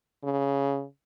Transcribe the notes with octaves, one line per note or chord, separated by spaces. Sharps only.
C#3